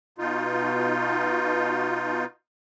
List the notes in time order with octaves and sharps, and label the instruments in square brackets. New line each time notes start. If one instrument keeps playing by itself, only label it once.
[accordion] B2 D#4 F4